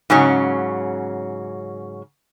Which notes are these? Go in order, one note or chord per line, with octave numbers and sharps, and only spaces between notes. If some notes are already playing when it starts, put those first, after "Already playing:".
G#2 C#3 F#3 C#4